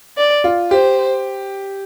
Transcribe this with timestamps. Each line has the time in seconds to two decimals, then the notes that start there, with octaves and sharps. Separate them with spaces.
0.17 D5
0.44 F4
0.71 G4 C5